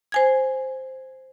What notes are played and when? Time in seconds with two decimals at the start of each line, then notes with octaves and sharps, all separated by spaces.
0.12 C5 G#5 G#6